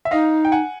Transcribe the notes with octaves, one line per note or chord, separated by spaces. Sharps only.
E5
D#4 D#5 F5
G5
F#5 G#5